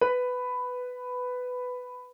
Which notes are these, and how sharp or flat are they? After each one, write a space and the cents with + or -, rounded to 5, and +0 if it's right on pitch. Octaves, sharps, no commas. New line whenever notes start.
B4 +15